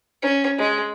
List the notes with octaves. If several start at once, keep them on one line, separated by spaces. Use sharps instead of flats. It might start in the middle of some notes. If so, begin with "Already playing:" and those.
C#4
G#3